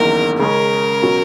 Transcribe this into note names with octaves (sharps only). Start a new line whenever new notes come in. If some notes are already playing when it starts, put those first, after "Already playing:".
Already playing: F#1 E2 D#3 A#3 E4 A#4
C#3 G#3 C#4 A#4
B2 F#3 C#4 F#4